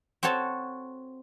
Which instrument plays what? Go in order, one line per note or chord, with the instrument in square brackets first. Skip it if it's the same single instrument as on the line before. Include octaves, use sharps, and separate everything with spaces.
[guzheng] C4 F#4 A4 C#5 A5